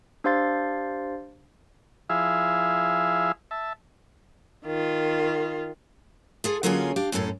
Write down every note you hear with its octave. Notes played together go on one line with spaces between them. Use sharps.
D4 G4 C5 F5 C6 A6
F3 E4 G#4 E5 F5
E5 A5
D#3 F4
F4 G#4 A4
D3 F#3 A#3 C#4 F4 G#4
D4 G4 F5
F#2 A2 C#4 F#4 A4